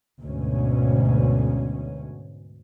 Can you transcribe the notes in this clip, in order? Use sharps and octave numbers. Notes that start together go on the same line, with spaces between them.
D2 G#2 B2 C#4